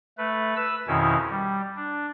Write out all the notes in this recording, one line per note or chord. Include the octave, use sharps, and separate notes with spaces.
A3 B4
B4 E6
F2 B2 D#3 C#4 E4
G3
D4